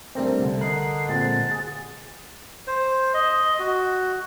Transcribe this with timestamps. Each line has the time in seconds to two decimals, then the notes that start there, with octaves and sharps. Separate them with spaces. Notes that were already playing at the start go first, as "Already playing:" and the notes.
0.15 G3 A3 C4 D4 A#4 C5
0.39 C2 D3
0.61 A#4 D#5 F#6 C7
1.09 A#2 G#3 C4 A6
1.51 G#4
2.67 C5
3.14 D#5
3.59 F#4